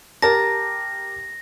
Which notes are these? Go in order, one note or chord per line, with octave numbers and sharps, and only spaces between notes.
G4 A#4 A5 A#5 A#6